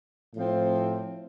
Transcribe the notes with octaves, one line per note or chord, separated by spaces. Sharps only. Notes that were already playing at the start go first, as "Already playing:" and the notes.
A2 F3 C4